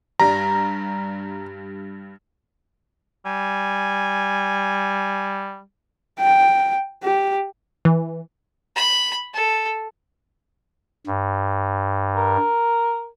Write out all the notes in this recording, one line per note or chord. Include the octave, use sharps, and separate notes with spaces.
G2 G3 A#5
G3 G#5
G5
G4
E3
B5
A4
G2
A#4